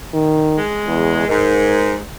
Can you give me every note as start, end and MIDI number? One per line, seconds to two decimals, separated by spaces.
0.14 0.59 51
0.56 1.27 56
0.88 1.26 40
1.29 1.98 44
1.29 1.96 70